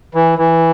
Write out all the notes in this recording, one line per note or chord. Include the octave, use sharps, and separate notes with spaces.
E3
E3